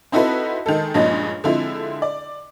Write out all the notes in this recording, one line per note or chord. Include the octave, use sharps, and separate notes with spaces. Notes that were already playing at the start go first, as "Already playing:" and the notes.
C4 D#4 E4 F#4 A4 B4
D#3 G#3 A4
G2 A#2 F3 G#3 C#4 D#4
D3 F3 G#3 C4 E4
D5